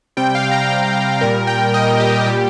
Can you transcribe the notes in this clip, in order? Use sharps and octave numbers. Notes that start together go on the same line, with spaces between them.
C3 G3 G5
F5
A#5
G5
A#2 G3 A#4
G5
D#5
G4
A#2 G3 G4